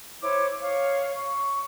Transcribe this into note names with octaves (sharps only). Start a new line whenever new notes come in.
E4 C5 C#5 D6
C#5 F5
C#6